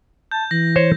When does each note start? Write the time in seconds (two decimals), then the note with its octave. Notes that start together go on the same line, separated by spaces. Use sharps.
0.31 A5 G6
0.51 E3 A#6
0.76 C5 C#5